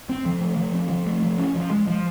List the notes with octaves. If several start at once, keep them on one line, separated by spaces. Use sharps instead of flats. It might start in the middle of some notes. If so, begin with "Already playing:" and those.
C4
F3
A3
F3
C4
F3
A3
F3
C#4
F3
G#3
F3